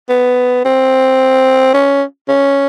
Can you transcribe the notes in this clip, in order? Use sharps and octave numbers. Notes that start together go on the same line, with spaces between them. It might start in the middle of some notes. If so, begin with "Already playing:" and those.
B3
C4
C#4
C#4